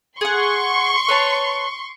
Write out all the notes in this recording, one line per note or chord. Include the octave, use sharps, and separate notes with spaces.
G#4 F#5 C6 C#6
B4 C#5 A5